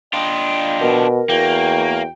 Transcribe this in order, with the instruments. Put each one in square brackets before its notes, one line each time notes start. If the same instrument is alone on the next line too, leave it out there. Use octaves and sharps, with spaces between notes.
[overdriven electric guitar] D4 F4 [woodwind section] D#5 G5
[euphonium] B2 [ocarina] A#4
[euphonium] E2 [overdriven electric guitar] A#3 [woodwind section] F#4 G5